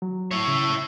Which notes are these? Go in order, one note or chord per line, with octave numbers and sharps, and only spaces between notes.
F#3
E4 C#5
C#3